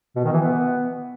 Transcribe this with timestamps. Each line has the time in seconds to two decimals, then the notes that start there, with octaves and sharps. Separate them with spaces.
0.16 B2
0.25 D#3
0.33 E3
0.42 B3